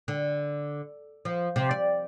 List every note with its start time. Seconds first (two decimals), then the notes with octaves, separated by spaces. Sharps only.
0.08 D3
1.25 F3
1.56 C3
1.71 D5